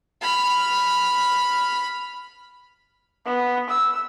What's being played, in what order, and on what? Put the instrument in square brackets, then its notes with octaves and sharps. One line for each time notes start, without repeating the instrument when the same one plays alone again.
[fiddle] B5 F6
[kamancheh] B3
E6